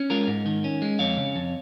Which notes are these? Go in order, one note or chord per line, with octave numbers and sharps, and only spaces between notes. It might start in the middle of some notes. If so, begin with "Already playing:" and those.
Already playing: C#4
G#3 F4 A#4
G#2
D#3
C#4
G#3
F2 C#5 F5
C#3
F2